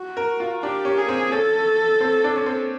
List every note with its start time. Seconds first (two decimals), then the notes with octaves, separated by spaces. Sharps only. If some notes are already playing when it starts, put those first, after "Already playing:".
Already playing: F#4
0.17 A#4
0.40 F4
0.63 D4 G4
0.85 C#4
0.98 G#4
1.08 C4
1.32 C#4 A4
2.01 C4
2.24 D4
2.36 C#4
2.46 C4